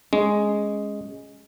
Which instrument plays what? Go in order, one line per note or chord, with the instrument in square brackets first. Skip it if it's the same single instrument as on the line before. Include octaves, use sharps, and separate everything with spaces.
[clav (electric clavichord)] G#3 [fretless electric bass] C#4